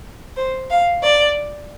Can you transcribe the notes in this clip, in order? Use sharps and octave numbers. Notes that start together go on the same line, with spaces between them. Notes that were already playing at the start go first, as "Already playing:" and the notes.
C5
F5
D5